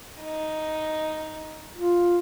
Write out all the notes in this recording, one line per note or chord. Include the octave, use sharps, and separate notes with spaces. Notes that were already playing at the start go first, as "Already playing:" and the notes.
D#4
F4